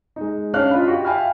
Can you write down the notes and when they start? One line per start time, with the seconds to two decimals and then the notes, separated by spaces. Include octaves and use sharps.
0.16 G#3 D#4
0.54 C#4 D4 F5 F6 F#6
0.71 F4 D#5 B5
0.88 F#4 G4
1.05 E5 F5 G5 G#5 B5 F6